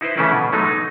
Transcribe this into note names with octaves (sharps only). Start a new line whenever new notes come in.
D#4 E4 B4 C5
C#3 E3 A3 C#4 E4 B4
B2
F#3 G#3 A3 B3 D#4
D#4